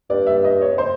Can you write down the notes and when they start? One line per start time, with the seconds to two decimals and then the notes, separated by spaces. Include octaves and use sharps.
0.10 G2 D5
0.27 E5
0.44 D#5
0.61 C#5
0.78 C5